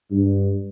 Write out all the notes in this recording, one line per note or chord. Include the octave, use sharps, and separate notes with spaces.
G2